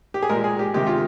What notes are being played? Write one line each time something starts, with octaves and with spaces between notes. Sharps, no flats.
G4
G#4
A#2 G#3 A#4
G#4
G4
C3 D#3 G#3 G4
F4